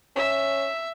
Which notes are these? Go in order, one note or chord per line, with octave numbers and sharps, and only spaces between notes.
C#4 E5